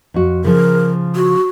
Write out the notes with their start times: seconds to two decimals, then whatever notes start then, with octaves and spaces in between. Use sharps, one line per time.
0.14 F2 F#4
0.44 C#3 F3 A#4
1.16 F#4